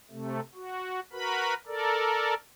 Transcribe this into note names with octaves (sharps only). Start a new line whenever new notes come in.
C3 A3
F#4
F#4 A#4 B4 B5
A4 A#4 D5